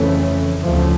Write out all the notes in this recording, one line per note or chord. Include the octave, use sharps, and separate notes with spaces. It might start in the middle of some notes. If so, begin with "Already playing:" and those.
Already playing: F2 C#3 E3 A3 C#4
D2 C#3 F3 A3